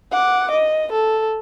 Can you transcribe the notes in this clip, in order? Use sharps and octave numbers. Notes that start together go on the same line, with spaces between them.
F#5 D6
D#5
A4